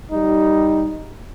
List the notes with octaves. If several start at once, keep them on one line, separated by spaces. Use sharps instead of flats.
G3 D#4